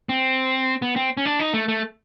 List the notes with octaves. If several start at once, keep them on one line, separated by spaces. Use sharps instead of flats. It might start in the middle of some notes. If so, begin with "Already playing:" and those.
C4
B3
C4
C#4
D4
D#4
A3
A3